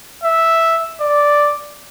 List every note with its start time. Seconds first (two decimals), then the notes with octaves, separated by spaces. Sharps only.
0.23 E5
1.01 D5